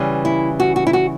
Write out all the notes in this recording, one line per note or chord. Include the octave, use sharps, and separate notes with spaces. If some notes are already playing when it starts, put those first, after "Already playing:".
Already playing: C#3 E3 G3
E4
F#4
F#4
E4
F#4